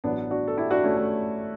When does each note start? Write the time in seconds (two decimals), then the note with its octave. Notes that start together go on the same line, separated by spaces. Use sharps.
0.04 A1 A2 F#3 B3 D4
0.31 D4 F#4
0.48 A4
0.57 E4 G4
0.70 D4 F#4
0.84 A3 C#4
0.97 A3